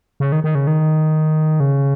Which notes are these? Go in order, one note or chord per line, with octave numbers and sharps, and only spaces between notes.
C#3
D#3
D#3
C#3
D#3
C#3